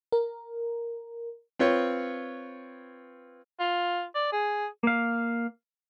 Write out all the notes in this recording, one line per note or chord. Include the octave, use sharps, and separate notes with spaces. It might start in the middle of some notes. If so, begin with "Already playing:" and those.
A#4
C4 F4 B4 C#5
F4
D5
G#4
A#3 F5